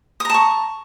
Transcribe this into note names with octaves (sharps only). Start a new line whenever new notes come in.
A5 A#5 C#6 D#6